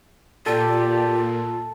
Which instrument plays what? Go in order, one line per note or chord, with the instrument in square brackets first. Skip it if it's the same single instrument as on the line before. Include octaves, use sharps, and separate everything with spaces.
[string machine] A#2 [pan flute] F4 [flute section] G4 D5 [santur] A4